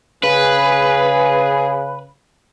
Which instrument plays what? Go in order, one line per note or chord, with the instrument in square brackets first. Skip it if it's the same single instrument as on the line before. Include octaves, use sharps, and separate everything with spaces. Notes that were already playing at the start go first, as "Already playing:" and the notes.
[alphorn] C#3 [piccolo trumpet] G#4 [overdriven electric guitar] B4